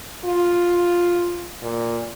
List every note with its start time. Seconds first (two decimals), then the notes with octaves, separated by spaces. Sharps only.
0.25 F4
1.63 A#2